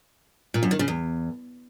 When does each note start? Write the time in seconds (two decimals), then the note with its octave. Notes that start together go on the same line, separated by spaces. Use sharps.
0.54 A#2
0.63 F#2
0.71 D#3
0.79 C#3
0.88 E2